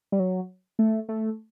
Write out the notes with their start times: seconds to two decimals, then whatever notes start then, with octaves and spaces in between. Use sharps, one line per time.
0.12 G3
0.20 F#3
0.79 A3
1.09 A3